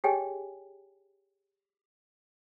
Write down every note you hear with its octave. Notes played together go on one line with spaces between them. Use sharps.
G4 G#4 C#5 D#5 G5 G#5